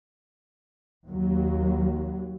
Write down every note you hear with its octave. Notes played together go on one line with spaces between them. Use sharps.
D#2 F#3